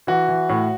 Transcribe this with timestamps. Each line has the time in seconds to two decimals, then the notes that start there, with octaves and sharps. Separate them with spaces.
0.07 E3 F#4
0.28 E3
0.49 A2